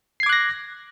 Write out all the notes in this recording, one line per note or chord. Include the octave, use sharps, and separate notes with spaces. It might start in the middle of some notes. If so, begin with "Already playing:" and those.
D6 F#6 G#6 A#6 C7